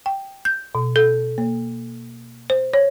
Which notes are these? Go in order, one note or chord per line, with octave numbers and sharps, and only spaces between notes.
G5
G6
B2
A4
A#3
C5
C#5